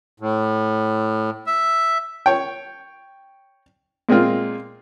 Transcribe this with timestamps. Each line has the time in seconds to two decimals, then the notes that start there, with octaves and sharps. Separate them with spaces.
0.20 A2
1.47 E5
2.26 C#5 G5
4.09 A#2 G#3 A#3 C4 F4